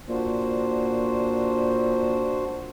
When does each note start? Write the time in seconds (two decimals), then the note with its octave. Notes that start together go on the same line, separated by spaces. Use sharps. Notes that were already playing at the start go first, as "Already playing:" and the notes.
0.09 A#2 D4 F#4 C5